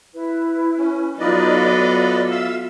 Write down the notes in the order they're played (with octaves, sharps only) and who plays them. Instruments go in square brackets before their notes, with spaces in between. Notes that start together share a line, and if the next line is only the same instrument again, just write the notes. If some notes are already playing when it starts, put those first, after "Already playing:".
[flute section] E4 B4
[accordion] C#4
[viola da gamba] F#3 B3 A4 [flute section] D#4 F4 [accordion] B4 D5 D#5
[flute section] F4
[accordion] E5 F5 E6